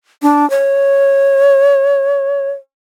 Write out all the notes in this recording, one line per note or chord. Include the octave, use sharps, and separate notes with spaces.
D4
C#5